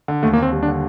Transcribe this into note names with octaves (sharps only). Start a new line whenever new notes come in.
D3
D#2 A3
A#3
D#2 C4
G3
D4
D3